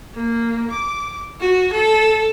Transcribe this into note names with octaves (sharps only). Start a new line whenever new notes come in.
A#3
D6
F#4
A4